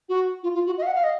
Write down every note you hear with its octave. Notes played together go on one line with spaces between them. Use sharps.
F#4
F4
F4
F#4
D#5
F5
F#5
F5
D#5